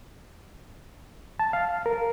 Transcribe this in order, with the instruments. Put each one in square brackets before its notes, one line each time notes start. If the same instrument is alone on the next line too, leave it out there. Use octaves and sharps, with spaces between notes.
[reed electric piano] A5
F5
A#4